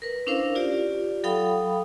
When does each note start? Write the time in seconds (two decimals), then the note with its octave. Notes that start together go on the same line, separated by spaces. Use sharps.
0.02 A#4 B4
0.27 C#4 D4 E4 A#4 C5 F5
0.55 F4 G4 D5
1.24 F#3 A4 F5 G5 B5 D#6